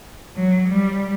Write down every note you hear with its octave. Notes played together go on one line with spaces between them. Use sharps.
F#3
G3